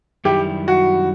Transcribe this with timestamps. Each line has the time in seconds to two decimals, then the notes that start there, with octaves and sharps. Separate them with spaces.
0.25 F#2 D#3 G3 E4 G4
0.68 F#4